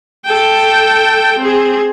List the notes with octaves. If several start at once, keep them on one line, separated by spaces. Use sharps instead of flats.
A4 G5
C4 G#4